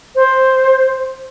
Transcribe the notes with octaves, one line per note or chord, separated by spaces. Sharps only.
C5